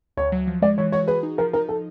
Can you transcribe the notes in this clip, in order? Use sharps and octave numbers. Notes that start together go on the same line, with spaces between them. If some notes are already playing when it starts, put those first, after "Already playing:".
D2 C#5
F#3
F3
G#3 D5
E3 C#5
F#4 C#5
G#4 B4
D#4
F3 A#4
D#4 A#4
A4